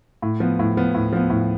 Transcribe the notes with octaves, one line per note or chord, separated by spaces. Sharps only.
A2
F3 B3
A2
F3 B3
A2
F3 B3
A2